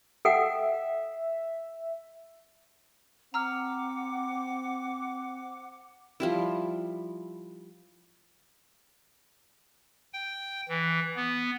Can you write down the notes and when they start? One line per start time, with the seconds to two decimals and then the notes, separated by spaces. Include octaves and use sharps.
0.25 A4 E5 F#5 G5
3.34 C4 F#5 A#5 D6 E6 F6
6.20 F3 G3 E4
10.13 G5
10.69 E3
11.16 B3